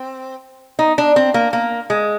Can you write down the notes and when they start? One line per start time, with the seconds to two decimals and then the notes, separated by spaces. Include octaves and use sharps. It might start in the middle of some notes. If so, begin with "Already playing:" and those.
Already playing: C4
0.79 D#4
0.98 D4
1.16 C4
1.34 A#3
1.53 A#3
1.90 G#3